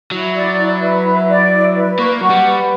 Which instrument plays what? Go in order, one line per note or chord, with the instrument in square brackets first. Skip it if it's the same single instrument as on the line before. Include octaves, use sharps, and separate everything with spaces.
[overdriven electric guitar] F#3 [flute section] E4
[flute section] D5
E4
B4
E4
D5
E4
B4
[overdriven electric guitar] A#3 [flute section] C#6
[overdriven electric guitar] F#3 [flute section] F#5
[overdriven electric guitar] G3
[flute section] B4